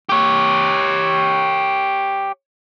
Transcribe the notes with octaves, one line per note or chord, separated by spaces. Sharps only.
G4 C#5